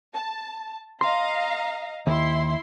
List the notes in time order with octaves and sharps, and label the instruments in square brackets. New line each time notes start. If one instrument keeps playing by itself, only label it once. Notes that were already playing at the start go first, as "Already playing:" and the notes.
[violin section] A5
[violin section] D#5 F5 A#5 [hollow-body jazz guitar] C6
[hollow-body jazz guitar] D#2 [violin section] E4 C6